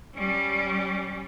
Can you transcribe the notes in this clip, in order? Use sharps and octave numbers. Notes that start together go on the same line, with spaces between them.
G3 C#4